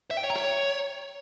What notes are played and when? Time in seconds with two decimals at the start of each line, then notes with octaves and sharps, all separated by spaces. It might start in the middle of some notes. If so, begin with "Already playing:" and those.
0.11 E5
0.17 G5
0.24 C#5
0.30 A#5
0.36 C#5